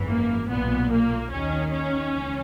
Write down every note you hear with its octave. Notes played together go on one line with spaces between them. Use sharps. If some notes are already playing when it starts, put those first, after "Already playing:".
Already playing: G#1 F#2 E3
A#3
B1 A#2 B3
A#3
D#2 D#3 C#4
C#4
C#2 E3